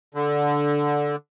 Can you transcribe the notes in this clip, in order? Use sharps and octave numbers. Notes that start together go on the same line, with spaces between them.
D3